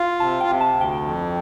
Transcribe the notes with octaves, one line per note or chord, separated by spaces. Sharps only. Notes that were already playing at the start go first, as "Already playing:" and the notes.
Already playing: F4
C3 A5
G5
C3
A5
D2
G5
F2